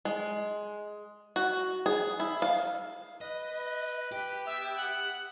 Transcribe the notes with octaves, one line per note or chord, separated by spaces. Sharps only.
G#3
F#4
G#4
E4
F5
B4 D#5
B4
G4
B3 E5
F#5